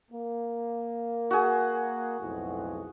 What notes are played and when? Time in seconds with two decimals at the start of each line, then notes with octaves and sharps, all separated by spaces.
0.11 A#3
1.31 F#4 G#4
2.20 B1 F2 A2